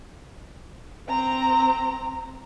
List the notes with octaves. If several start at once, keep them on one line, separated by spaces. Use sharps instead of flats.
C4 A#5